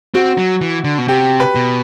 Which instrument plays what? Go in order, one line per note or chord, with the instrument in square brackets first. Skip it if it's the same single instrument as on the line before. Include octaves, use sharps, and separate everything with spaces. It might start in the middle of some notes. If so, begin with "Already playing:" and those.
[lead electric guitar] C4 [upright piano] F#4
[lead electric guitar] F#3
E3
D3
B2
[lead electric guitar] C3 [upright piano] G4
[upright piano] B4
[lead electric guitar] B2